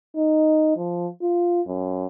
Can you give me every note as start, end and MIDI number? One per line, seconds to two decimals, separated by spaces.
0.16 0.74 63
0.77 1.07 53
1.22 1.61 65
1.67 2.06 42